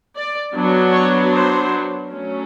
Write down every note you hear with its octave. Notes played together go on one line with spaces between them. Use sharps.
D5
F#3 B3 D4
C#5
C5
F#3 A3 C#4